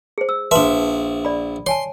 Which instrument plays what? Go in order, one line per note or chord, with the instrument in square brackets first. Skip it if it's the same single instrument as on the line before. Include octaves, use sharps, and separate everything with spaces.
[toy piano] G#4 C5
E6
[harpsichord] A#1 E5 [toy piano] B4 A5 C6
[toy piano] D5 B5
[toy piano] C#5 G#5 A5 [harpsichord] C6